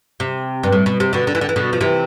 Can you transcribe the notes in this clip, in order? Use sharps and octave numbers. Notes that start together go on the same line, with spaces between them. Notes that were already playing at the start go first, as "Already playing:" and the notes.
C3
G2
A2
B2
C3
B2 D3
D3
E3
D3
E3
B2 D3
F3
C3 E3